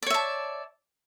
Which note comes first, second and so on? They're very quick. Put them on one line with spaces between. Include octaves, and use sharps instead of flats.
D5 C#5 E5 A5